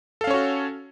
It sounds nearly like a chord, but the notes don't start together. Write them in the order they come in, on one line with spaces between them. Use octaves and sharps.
A4 F5 C#4 C#5 F#4